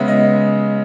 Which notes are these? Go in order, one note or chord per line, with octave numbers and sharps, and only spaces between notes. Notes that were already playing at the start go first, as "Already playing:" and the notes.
Already playing: C#3 G#3 B3 E5
D#5